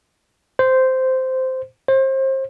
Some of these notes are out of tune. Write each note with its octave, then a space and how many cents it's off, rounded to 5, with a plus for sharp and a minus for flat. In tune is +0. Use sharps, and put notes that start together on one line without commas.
C5 -10
C5 +30